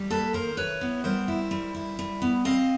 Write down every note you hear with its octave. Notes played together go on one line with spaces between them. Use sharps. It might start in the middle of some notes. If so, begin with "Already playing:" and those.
Already playing: G3
A#3 A4 B4
D#3 A#4 C5
E4 B4 C#5
B3
G3 A#4 C5
E4
G3
E4
G3
B3
C4 D#5 F5